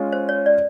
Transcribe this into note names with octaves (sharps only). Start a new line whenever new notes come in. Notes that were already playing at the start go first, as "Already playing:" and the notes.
Already playing: G#3 C#4 F4
C5
C#5
D5